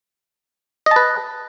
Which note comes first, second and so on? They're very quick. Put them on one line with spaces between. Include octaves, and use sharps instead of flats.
D#5 A5 B4